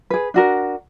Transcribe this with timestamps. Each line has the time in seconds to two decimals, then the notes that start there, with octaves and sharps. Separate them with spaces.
0.10 G#4 B4
0.34 D4 F#4 A#4